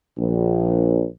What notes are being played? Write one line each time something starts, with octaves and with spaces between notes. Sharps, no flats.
A#1